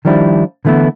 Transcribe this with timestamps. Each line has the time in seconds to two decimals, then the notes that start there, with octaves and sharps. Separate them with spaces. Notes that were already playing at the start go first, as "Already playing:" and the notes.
0.05 D#3 F3 G3 D4 E4
0.65 D3 E3 A3 B3 E4